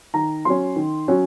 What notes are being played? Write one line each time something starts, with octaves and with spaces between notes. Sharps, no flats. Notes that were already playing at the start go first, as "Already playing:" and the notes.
D#3 A#5
F#3 C#4 C6
D#3
F#3 C#4